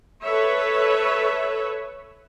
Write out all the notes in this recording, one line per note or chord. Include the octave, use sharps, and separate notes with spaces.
A4 B4 C#5 E5